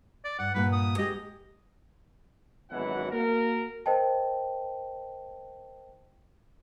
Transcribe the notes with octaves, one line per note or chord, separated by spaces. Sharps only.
D5
G2 F#5
G2 A#2 B4 F#5
D#6
G#3 G4 D#5
G#1 F#2 B2 E3 F#5
A#3 F#4 A#4
A#4 C5 D#5 G5 A5